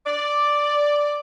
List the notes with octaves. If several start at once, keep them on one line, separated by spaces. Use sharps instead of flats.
D5